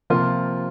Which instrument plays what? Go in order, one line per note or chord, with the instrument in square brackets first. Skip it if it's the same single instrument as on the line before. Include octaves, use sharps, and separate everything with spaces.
[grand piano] C3 F3 A#3 F4